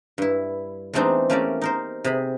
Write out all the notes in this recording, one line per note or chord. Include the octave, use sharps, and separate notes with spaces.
G2 E4
E2 G#3 A3 C4 D4 D#4
A3 A#3 C#4 G4 A#4 D5
D#4 A#4 C5
C3 G#4 B5